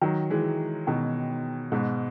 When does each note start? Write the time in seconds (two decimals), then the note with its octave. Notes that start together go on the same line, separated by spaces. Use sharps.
0.01 D#3 F#3
0.30 E3 G#3
0.87 B2 D#3
1.72 G#2 B2